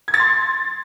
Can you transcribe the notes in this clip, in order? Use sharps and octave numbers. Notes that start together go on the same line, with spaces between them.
G#6
A6
C6